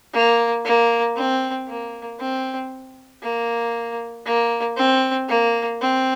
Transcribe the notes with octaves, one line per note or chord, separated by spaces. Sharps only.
A#3
A#3
C4
A#3
C4
A#3
A#3
C4
A#3
C4